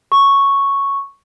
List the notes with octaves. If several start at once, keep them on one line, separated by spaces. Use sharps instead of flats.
C#6